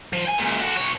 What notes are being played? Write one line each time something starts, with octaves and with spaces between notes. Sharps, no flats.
F3
G5 G#5
C#2 A#2
F#4 A4
B2 C#5